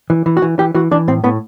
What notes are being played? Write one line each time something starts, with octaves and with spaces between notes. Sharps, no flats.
E3
E3
F#4
E3
E3 G4
E3 F#4
E3 D4
A2 C4
A2 B3